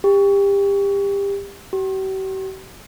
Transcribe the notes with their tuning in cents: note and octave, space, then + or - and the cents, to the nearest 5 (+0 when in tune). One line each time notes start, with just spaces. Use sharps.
G4 +25
G4 -45